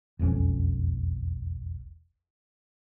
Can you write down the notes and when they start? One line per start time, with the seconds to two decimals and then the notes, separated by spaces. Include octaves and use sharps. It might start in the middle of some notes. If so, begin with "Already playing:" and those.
0.19 E1 B1 F2 C#4